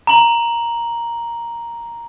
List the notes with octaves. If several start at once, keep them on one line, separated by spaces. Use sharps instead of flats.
A#5 F#7